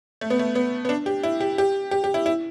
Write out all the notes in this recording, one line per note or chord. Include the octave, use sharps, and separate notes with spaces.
A3
B3
A3
B3
B3
D4
G4
E4
G4
G4
G4
G4
E4
E4